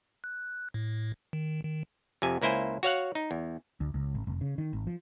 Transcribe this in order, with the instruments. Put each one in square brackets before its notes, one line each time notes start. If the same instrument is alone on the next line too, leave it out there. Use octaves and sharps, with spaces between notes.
[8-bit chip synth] F#6
A2
D#3
D#3
[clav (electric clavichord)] F2 C3 G#5
C#2 A#3 E4 C5 G#5
F#4 C#5 F5 F#5
D#4
E2
[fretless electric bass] D2
C#2
G#1
F1
C#3
D#3
G#1
F3